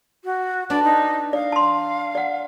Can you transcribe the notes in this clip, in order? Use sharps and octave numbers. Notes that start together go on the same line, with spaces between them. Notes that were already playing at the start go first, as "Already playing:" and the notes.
F#4
D4 B4 D5
D#4
D5 F5
A5 C6
D5 F#5